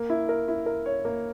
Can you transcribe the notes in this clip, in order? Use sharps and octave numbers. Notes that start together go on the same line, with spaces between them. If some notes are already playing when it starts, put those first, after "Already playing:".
Already playing: A#3
E4
A#4
E4
A#4
C#5
A#3